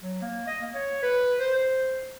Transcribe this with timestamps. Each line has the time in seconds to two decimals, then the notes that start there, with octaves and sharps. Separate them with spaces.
0.02 F#3
0.22 A#3
0.47 D#5
0.61 A#3
0.74 C#5
1.03 B4
1.39 C5
1.54 C5